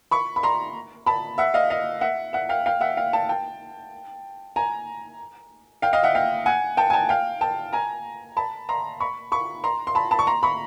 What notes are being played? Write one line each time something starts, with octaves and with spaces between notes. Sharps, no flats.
B5 C#6
B5
A#5 C6
A5 B5
E5 F#5
D#5 F5
D#5 F5
E5 F#5
E5 F#5
F5 G5
F5 G5
E5 F#5
F5 G5
G5 A5
G5 A5
G#5 A#5
F5 G5
D#5 F5
E5 F#5
F5 G5
F#5 G#5
G5 A5
G#5
G5 A5
F5 G5
G5 A5
G#5 A#5
A5 B5
A#5 C6
B5 C#6
B5 C#6
A#5 C6
C6
A5 B5
A5 B5
C#6
A#5 C6
B5 C#6